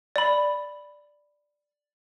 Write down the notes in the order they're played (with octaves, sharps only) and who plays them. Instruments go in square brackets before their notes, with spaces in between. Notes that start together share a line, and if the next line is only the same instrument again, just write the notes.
[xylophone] D5 B5